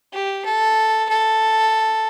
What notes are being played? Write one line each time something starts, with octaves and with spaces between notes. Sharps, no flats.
G4
A4
A4